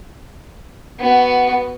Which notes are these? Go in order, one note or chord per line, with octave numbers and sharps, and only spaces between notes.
B3 F#4